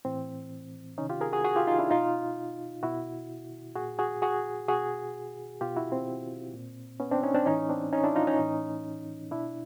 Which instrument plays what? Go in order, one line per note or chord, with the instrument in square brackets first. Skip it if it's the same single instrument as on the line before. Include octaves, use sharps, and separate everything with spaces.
[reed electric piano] A2 E3 C4
C3 D#3 C#4 D#4
F4 G4
G#4 A#4
F#4 G#4
F#4 G#4
F4 G4
D#4 F4
D4 E4
B2 D#4 F4
B2 E4 F#4
A#2 F#4 G#4
F#4 G#4
F#4 G#4
B2 F#4 G#4
B2 F4 G4
E4 F#4
C4
A#2
B3 C#4
C4 D4
C#4 D#4
C4 D4
A2 E3 C#4 D#4
C4 D4
C#4 D#4
D4 E4
D#4 F4
C#4 D#4
A2 E3
B2 D4 E4